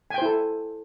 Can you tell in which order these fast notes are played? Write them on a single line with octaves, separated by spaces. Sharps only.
G#5 G5 C5 E4 A4